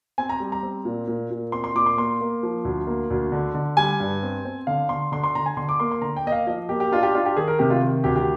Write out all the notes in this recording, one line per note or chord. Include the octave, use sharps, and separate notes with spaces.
C4 G#5
A#5
G3
A#5
C4
A#2
A#2
A#2
C4 C6
C6
A#2 D6
C6
A#3 C6
A#3
F3
D2
A#3
D2
D3
D3
G3 G#5
G2
C4
C4
D3 F5
D3 C6
D3 C6
C6
D3 A#5
G#5
D3 C6
D6
A#3 C6
C6
D3 A#5
G5
A#3 D#5
F5
F3 D#5
A#3 G4
G4
D4 F4
G4
D4 F4
G4
D#3 G#4
A#4
C3 G4
F4
D#3
D2 G4
G4